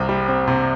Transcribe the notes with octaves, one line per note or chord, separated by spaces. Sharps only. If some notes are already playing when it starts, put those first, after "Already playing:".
Already playing: C2 C3 C4
G3
C4
C3